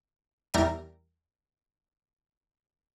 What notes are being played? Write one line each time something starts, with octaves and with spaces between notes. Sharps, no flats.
E2 G3 A#4 E5 A#6 D7